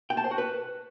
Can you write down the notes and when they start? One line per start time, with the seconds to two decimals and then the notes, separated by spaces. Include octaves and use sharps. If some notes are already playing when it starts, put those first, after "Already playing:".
0.10 G5
0.17 A5
0.24 C5
0.31 F#4
0.38 B4